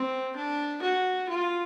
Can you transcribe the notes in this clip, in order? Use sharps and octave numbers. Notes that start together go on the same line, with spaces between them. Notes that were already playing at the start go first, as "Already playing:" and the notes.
Already playing: C4
D4
F#4
F4